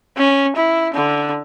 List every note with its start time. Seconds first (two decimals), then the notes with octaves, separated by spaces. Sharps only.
0.17 C#4
0.56 E4
0.94 D3